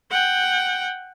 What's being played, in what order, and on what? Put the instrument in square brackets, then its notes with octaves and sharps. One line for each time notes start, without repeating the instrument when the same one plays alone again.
[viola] F#5 G5